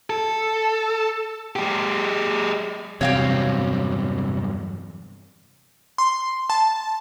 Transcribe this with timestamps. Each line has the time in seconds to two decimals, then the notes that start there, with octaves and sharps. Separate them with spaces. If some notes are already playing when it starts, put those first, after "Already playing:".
0.10 A4
1.56 G#3 G4
3.01 E2 G2 C3 F#3 C#5 F5 G5
5.98 C6
6.50 A5